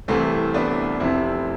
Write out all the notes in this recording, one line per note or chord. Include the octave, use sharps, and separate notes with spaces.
C2 C3 E3 A3 C4
B3 D4
F1 F2 C3 C4 E4